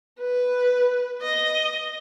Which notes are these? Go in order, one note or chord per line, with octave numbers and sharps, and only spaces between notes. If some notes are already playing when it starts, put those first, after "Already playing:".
B4
D#5